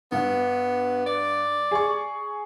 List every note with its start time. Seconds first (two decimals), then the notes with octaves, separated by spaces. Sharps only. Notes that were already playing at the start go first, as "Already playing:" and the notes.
0.12 G2 B3
1.06 D5
1.71 G#4 C#6